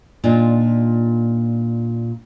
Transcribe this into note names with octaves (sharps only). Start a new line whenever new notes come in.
A#2 D4 D#4 F4